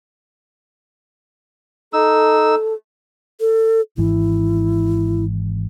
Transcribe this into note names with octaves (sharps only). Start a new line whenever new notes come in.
D#4 A4 E6
A4
G#1 G#2 E3 E4